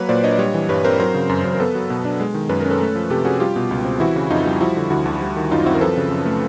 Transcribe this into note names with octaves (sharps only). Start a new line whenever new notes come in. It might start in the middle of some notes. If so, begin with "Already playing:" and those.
Already playing: F#3 A#3 B4 C#5
A#2 C5 D5
D4 C#5 D#5
D5
G3 C#5 D#5
E3
G2 B4 C#5
C4 A#4 C5
F#3 A#4 C5
C#3
F#2
F#2
A#4
B3 A4 B4
F#3
B2
D4
G#3
D#3
F#2 B4
C#4 A#4
A4 B4
A3
F3
C3 G4 A4
C#4 F#4 G#4
G3 F4 G4
B2
C#2
C4
E3 E4 F#4
C#3
F2 D#4 F4
G3
F3 E4 F#4
D3
D2 E4 F#4
D2
G3
D#3
F#2 D#4 F4
C4 E4 F#4
A#4
F3 A4 B4
C#3
F#2
A3